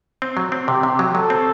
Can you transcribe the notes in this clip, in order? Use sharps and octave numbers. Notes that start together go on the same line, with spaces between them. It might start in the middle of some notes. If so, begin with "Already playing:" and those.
C4
F#3
C4
C3 G4
C3
F#3
F#3 A4
C4